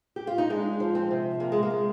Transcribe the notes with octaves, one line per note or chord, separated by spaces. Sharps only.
G4
F4
D#4
G#3 D4
F3
C4
C3
C3 A#3
G#3
A#3
G#3